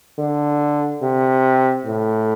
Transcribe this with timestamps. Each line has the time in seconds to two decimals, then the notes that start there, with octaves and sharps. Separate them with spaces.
0.19 D3
1.02 C3
1.86 A2